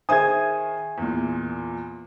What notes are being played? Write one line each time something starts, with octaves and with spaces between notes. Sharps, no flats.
D#3 G#4 C5 E5 G#5 D#6 G#6 D#7
E2 A#2